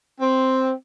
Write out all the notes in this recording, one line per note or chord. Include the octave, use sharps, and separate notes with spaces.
C4